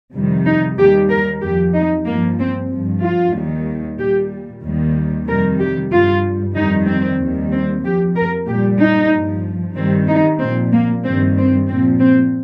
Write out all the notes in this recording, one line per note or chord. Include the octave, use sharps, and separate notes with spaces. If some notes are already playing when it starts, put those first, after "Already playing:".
F2 C3 D#3 G3
D#4
D#2 D#3 G3 G4
A#4
F2 F3 G4
D#4
G2 F3 A#3
C4
G2 F3
F4
D#2 D#3 G3
A#2 G3 G4
D#2 D#3 G3
F2 C3 D#3 G3 A#4
G4
G2 G3 F4
F2 D#3 G3 D#4
C4
D#2 D#3 G3
C4
F2 F3 G4
A#4
A#2 G3 G4
D#4
G2 F3
G2 D#3 G3 C4
D#4
A#2 F3 C4
A#3
G2 D#3 G3 C4
C4
A#2 F3 C4
C4